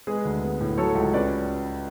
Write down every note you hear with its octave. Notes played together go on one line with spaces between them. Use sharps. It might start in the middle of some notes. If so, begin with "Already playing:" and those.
G#3 G#4 B4
D2
B3
A2
F#3 A4 C#5
C#2
C#4 B4 D5